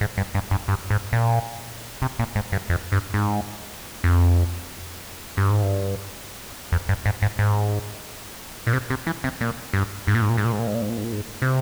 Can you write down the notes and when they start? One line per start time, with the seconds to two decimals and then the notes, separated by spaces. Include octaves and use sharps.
0.01 G#2
0.18 G2
0.35 G2
0.51 G2
0.68 G2
0.90 G#2
1.13 A#2
2.02 C3
2.19 A#2
2.36 G#2
2.52 G2
2.70 F2
2.92 G2
3.14 G#2
4.04 F2
5.37 G2
5.50 G#2
5.62 G2
6.72 F2
6.89 G2
7.06 G#2
7.22 G#2
7.39 G#2
8.67 A#2
8.73 C3
8.90 C3
9.07 E3
9.24 C3
9.41 A#2
9.73 G2
10.07 G#2
10.15 A#2
10.22 G#2
10.30 A#2
10.37 G#2
10.45 A#2
10.52 G#2
10.59 A#2
10.67 G#2
10.75 A#2
10.82 G#2
10.89 A#2
10.97 G#2
11.04 A#2
11.12 G#2
11.42 C3